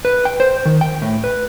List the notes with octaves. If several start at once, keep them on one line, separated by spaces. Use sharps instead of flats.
B4
G5
C5
D#3
G5
A2
B4